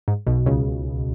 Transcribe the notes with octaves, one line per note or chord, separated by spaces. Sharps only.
G#2
B1 B2
C#2 C#3